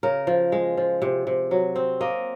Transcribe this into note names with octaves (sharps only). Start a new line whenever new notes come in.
C#3 A#4
F3
G#3
F3
C3
C3
F#3
C4
A#3 D#5